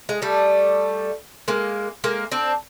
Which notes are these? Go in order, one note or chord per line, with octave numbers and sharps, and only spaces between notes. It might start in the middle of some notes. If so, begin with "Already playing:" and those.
G#3
G3 A3
G#3 A#3
G#3 A#3
C4 D4